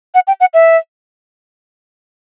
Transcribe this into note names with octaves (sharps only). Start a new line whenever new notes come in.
F#5
G5
F#5
E5